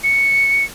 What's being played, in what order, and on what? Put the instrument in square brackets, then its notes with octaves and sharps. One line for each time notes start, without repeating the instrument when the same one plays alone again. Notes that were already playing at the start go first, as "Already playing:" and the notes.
[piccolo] C#7